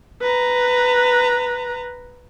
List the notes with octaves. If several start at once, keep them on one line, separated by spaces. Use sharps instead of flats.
B4 A#5